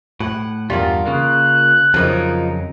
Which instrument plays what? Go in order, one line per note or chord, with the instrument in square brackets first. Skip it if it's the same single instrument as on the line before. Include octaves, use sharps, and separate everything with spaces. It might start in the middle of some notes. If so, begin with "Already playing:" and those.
[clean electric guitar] A2 [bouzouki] F#5
[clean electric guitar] E2 G2 G3 [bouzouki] F4 A#4
[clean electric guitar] C#3 A#3 [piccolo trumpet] F#6
[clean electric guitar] F2 C#3 F#3 [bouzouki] F3 A#3 D#4